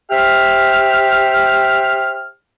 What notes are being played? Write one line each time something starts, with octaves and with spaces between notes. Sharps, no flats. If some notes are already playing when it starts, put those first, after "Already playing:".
G4 C5 E5 F6